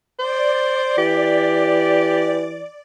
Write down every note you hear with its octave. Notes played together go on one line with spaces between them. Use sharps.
C5 D5
E3 G4